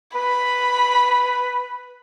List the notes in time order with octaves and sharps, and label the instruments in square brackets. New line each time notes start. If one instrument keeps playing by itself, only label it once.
[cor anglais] B4 [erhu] B5